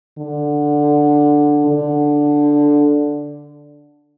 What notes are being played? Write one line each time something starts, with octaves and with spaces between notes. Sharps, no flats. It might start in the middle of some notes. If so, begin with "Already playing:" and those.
D3
D3